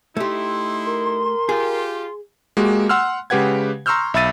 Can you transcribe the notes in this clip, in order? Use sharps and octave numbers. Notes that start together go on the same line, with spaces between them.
A3 D#4 E4 G4 C6
A#4
F4 G4 G#4
G#3 A#3 F#4 G4
F#5 C6 E6 F6
C#3 G#3 G4 B4 F#5 G#6
A#5 C6 C#6 E6 F6 G6
B1 E5 B5 E6 A6 D#7